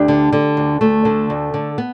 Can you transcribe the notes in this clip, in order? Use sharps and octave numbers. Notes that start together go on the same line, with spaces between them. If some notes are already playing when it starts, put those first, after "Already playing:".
Already playing: D2 D4 G4
D3
D3
D2
D2 A3
D3
D2
D3
B3